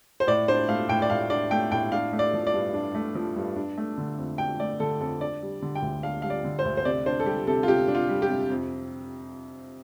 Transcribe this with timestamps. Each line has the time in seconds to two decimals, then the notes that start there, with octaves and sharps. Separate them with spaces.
0.20 C5
0.27 A2 D5
0.48 D4 C5
0.69 A3 F5
0.89 A2 G5
1.02 D5
1.10 A2 F5
1.30 D4 D5
1.51 A3 G5
1.72 A2 G5
1.92 D4 F5
2.13 A3
2.19 D5
2.33 F3
2.47 D5
2.53 G2
2.74 D4
2.95 A3
3.15 F3
3.36 G2
3.56 D4
3.78 A3
3.98 D3
4.18 F2
4.38 D4 G5
4.60 A3 D5
4.80 D3 A4
5.00 F2 A4
5.20 D4 D5
5.42 G3
5.62 D3
5.75 G5
5.82 D2
6.03 D4 F5
6.22 G3 F5
6.30 D5
6.44 D3
6.59 C5
6.65 D2
6.77 C5
6.85 C3 D5
7.06 D4 C5
7.20 A4
7.26 G3 G4
7.47 C3 A4
7.63 F4
7.68 C3 G4
7.88 D4
7.95 F4
8.09 G3
8.22 G4
8.29 C3
8.50 F2